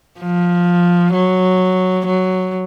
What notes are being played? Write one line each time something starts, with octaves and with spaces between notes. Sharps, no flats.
F3
F#3
F#3